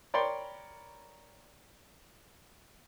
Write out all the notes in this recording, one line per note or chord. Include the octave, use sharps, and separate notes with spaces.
A#4 C#5 D5 G5 B5 C6